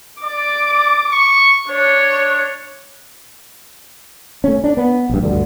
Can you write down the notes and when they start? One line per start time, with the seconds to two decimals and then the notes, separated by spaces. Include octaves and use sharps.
0.23 D5 D6
1.11 C#6
1.68 D4 C#5
4.44 A3 C#4
4.64 D4
4.77 B3
5.09 A#1 G2
5.23 D2 G2 D3